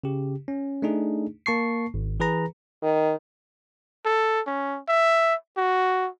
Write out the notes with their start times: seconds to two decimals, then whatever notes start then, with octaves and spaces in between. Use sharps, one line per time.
0.04 C#3 G4
0.48 C#4
0.82 A3 D4 D#4 G#4
1.46 A#3 A5 C#6 C7
1.94 G#1
2.20 E3 G#4 B4 A#5
2.82 D#3
4.05 A4
4.47 C#4
4.89 E5
5.57 F#4